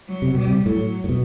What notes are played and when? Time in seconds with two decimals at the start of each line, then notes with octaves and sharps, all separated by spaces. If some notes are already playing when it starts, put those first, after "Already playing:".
0.08 F#3
0.22 C3
0.35 B2 G3
0.48 C3
0.65 A2 F#3
1.04 A2
1.09 B2